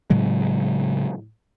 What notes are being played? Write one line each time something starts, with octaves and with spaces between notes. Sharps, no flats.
A2 C#3 F#3 G#3